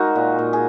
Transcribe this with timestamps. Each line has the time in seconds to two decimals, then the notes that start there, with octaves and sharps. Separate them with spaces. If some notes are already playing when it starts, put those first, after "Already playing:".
Already playing: G#3 D#4 F#4 A#4
0.15 A#2
0.39 A#2
0.53 G#4